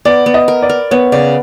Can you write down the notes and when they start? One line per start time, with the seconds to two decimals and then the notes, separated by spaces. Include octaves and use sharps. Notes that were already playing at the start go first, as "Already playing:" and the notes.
0.05 B3 D5
0.26 B3
0.34 D#5
0.48 A#4
0.62 D5
0.69 A#4
0.91 B3 C#5
1.12 C#3 D5